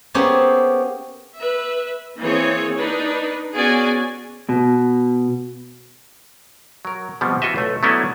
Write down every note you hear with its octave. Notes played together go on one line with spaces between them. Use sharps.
A#3 B3 C#4 G4 G#4 C5
B4 E5
E3 A#3 C4 G#4 C#5
D4 D#4 B4
B3 C#4 F#4 G#4 D5 G#5
B2
F#3 A#4
B2 F3 G3 B3 C4
E3 F4 F#4 B4 D#5 E5
B1 A3
F#3 A3 B3 C#4 D4 E4